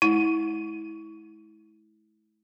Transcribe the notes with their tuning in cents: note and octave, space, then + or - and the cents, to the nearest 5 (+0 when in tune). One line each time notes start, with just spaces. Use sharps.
G#3 +45 E4 -25